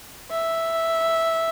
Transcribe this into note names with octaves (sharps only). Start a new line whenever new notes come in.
E5